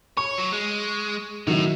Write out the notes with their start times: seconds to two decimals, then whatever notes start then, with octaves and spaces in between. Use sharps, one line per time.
0.17 C#5 C#6
0.38 F#3
0.52 G#3
1.47 A2 D#3 F#3 E4